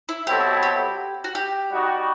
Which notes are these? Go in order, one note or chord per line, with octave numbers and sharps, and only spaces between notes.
E4
B2 F#3 C4 E4 G4 A4
G4
F#4
G4
G3 D#4 F#4